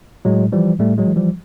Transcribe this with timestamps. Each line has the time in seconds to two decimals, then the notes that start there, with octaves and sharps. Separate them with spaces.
0.25 A2 F#3 G#3
0.52 E3 F3 G3
0.79 A2 G3 A3
0.98 F#3 G#3
1.07 E3
1.16 F3 G3